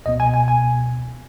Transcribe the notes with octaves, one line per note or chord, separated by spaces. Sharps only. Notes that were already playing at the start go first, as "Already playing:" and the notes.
C#2 B2 B3 D#5
G#5
G#5
G#5